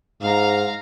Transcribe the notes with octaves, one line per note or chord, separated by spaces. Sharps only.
G#2 F5 A#5